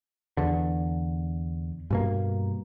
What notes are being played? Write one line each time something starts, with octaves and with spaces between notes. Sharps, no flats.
E2 D3
G2 B2 A#3